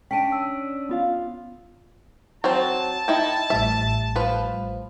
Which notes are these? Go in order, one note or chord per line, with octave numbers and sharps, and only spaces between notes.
C#4 D4 G5 A5 B6 D7 D#7
E6
B3 F4 F5
F#3 C4 C5 A5
D#4 E4 G5
A1 A2 G3 E5
F3 B4